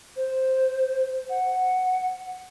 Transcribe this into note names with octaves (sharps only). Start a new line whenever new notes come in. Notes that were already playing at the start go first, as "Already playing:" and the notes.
C5
F#5